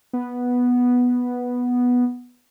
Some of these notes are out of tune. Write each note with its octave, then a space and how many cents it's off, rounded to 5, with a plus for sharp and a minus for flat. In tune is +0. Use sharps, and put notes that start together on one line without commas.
B3 -5